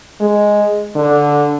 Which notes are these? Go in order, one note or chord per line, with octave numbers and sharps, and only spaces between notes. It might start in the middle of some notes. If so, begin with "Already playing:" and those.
G#3
D3